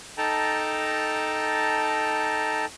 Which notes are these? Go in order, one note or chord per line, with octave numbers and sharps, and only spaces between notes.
D#4 A4 G5 A5 A#5